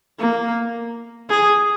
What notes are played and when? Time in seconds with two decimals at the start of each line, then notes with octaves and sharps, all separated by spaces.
0.19 A#3
1.30 G#4